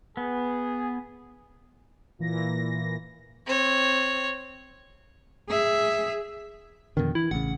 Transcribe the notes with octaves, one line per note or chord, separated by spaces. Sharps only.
B3 G#4
A#2 E3 A#6
C4 C#5
G#4 E5
F2 B2 D3 D#3
E3 E4
A1 C#3 F#5